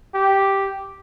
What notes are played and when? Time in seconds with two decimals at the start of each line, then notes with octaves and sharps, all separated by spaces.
0.14 G4